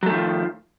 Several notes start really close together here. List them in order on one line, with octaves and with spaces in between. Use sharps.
F#3 A3 D#3 F3